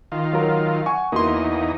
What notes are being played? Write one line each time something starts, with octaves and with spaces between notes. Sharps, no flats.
D#3 F4
F#3 A#4
F#5 G#5 C#6
E2 A#3 D#4 F#4 C6